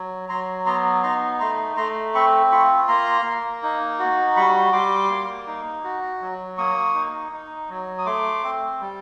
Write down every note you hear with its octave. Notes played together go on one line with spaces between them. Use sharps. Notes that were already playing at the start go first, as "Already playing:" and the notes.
Already playing: F#3
F#3 A#5 C6
B3 A#5 C6
D#4 A#5 C6
A3 A#5 C6
A3 A#5 C6
C4 B5 C#6
F4 B5 C#6
A#3 A#5 C6
A#3
D#4
F#4
G3 B5 C#6
G3 C6 D6
A#3
D#4
F#4
F#3
A#3 C#6 D#6
D#4
D#4
F#3
D#6
A3 C6 D6
C4
G3